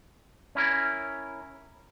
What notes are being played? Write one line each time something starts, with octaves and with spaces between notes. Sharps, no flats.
C#4 E4 A#4